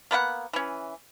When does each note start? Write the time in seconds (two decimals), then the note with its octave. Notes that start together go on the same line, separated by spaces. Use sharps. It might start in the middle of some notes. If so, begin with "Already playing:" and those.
0.11 A#3 B3 A#4 F#5
0.53 E3 C#4